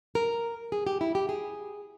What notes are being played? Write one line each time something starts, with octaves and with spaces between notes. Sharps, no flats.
A#4
G#4
G4
E4
G4
G#4